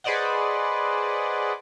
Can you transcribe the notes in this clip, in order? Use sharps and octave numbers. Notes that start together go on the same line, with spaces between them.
G#4 B4 C5 D5 D#5 F#5